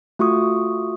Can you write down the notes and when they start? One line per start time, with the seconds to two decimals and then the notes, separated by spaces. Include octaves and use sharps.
0.19 A3 F4 F#4 C#6 D#6